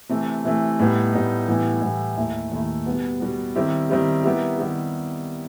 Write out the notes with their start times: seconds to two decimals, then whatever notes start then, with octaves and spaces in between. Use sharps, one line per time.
0.09 C3 E3 A3
0.45 C3 E3 A3
0.79 A2 G3 B3 D#4
1.13 A2 G3 B3 D#4
1.47 A2 E3 G3 B3
1.82 A2 E3 G3 B3
2.17 D#2 D#3 A3 E4
2.51 D#2 D#3 A3 E4
2.86 B2 G3 B3
3.20 B2 G3 B3
3.55 D#3 G3 C4 E4 G4
3.90 D#3 G3 C4 E4 G4
4.24 D#3 G3 B3 E4 G4
4.58 D#3 G3 B3 E4 G4